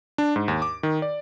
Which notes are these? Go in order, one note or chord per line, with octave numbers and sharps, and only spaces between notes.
D4
G#2
D#2
D6
D#3
D5